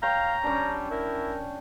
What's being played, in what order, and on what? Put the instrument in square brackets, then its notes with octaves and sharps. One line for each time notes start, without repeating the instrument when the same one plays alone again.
[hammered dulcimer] C#5 G5 [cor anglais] F5 [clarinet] A#5
[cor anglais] G3 [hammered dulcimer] C#4 D4
[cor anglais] E4 [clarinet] A#4